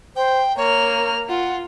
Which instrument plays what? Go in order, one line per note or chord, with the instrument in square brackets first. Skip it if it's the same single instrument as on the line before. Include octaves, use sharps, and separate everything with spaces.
[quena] C5 [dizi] G5
[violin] A#3 F6 [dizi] C#5 [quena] A#5
[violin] F4 [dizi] F#5